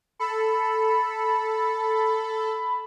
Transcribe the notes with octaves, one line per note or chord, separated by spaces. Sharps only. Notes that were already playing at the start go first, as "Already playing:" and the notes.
A4 B5